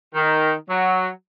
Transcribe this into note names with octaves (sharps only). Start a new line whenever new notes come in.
D#3
F#3